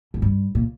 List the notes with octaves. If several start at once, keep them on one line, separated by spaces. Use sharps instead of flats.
G#2
G2
A#2